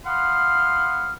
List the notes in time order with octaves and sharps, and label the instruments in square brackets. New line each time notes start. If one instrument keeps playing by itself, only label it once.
[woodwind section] F5 F#5 B5 C6 D#6 F6